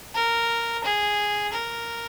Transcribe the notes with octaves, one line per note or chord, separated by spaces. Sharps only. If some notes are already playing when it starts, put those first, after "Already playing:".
A#4
G#4
A#4